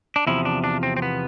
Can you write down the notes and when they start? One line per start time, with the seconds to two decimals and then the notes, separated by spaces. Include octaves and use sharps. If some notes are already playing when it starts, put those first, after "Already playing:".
0.16 D4
0.27 E2 C3 F3 E4
0.45 D4
0.64 D4
0.83 C4
0.97 C4
1.02 B3